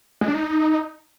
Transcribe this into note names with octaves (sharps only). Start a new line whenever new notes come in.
G#3
D4
D#4